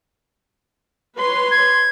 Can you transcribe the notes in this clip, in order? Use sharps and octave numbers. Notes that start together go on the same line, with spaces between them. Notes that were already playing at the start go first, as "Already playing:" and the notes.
B4 C#5 C6
G#6